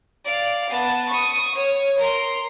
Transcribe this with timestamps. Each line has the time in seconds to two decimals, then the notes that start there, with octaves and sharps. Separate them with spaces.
0.25 D5 F5
0.69 B3 A5
1.09 C#6 D#6
1.55 C#5
1.98 A#4 C6